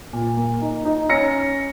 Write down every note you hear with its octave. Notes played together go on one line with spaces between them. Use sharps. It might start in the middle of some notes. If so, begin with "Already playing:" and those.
A#2
A#3
D#4
D#4
C#4 A#6 C#7